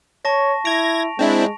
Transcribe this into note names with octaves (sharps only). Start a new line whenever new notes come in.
C#5 A5 C#6 A#6
E4 G#6 A#6 D7 F7
G#3 C4 D4 E4